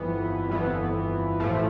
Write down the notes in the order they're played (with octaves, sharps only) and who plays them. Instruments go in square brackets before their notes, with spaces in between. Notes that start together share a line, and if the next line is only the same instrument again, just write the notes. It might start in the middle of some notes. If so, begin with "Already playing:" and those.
Already playing: [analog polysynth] G1 F2 E3 B3
G1 F2 E3 B3
A1 A2 F3 A3